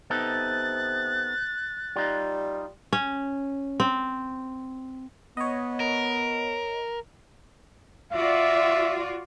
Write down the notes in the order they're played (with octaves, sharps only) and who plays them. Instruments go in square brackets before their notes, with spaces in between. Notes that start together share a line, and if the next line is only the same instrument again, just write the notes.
[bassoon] C3 [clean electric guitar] B3 D#4 A4 [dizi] F#6 [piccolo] A6
[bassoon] G3 [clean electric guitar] D#4 F4
[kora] C#4
C4
[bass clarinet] B3 [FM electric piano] C#5 D#5
[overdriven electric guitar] A#4
[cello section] F4 F#4 D5 [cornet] E5